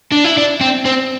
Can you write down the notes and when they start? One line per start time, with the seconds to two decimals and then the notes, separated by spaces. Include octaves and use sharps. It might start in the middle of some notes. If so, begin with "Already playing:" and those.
0.12 D4
0.24 E4
0.37 D4
0.61 C4
0.86 C4